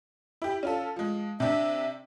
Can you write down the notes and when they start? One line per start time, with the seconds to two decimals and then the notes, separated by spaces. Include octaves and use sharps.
0.42 E4 G4
0.63 C#4 F4 A4
0.96 F3 G#3
1.40 C3 D4 E5